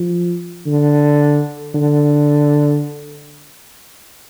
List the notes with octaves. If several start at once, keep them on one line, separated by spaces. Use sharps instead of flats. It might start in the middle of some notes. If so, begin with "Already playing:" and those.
Already playing: F3
D3
D3